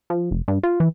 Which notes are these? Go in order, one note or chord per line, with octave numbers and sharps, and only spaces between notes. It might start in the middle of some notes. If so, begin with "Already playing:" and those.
F3
F1
G2
F4
E3